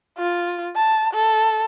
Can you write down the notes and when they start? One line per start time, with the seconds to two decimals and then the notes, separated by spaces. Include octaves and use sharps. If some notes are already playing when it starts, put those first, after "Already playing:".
0.18 F4
0.75 A5
1.13 A4